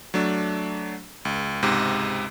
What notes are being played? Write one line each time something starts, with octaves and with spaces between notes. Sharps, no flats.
F#3 A3 D4
C#2
C#2 G#2 C3